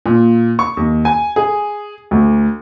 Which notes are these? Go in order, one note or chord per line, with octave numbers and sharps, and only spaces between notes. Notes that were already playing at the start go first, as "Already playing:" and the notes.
A#2
C#6
D#2
G#5
G#4
D2